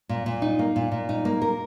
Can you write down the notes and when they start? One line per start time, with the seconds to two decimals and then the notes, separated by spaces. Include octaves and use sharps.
0.09 A#2
0.26 A#2
0.42 D#4
0.59 A#3
0.76 A#2
0.92 A#2
1.09 D#4
1.25 A#3
1.42 A#4